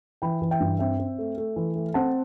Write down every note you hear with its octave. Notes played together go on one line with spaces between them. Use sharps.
E3 G5 B5
E3
E5 G5
G2
C4 E5 G5
C4
A3
A3
E3
A3
C4 F#5 A5